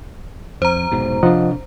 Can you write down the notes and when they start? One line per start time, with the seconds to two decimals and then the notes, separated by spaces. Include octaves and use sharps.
0.62 F2 C5 A#5
0.92 F1 G#2 B2
1.23 C3 F3 D4 D#5 F#5